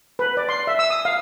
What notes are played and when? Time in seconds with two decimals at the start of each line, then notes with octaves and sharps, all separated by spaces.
0.19 B4
0.37 D5
0.49 C6
0.67 E5
0.79 E6
0.90 D#6
1.05 F5